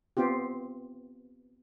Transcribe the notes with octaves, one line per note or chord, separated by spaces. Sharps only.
B3 C4 F4 G4